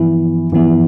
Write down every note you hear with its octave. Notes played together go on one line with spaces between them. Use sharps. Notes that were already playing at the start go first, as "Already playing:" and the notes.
Already playing: G2 E3 F3 B3
G2 E3 F3 B3